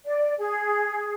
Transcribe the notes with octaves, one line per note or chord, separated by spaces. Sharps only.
D5
G#4